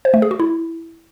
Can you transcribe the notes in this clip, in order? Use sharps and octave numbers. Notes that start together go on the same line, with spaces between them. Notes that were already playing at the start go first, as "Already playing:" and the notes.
C5
A3
G#4
F#4
E4